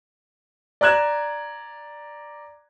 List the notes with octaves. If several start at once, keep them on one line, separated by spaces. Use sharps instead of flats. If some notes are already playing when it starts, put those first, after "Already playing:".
D5 A#5 F#6 G#6 E7